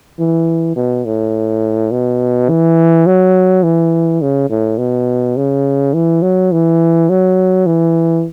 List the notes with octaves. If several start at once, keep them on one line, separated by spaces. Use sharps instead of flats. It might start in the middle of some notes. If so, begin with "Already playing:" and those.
E3
B2
A2
B2
E3
F#3
E3
C#3
A2
B2
C#3
E3
F#3
E3
F#3
E3